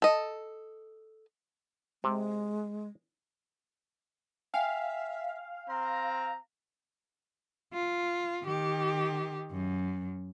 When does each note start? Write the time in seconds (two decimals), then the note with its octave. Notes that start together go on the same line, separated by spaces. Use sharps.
0.02 A4 D#5
2.04 C3 G#3
4.54 E5 F5 G5 G#5
5.68 C4 A#5 C6
7.74 F4
8.44 D#3 G4
9.51 F#2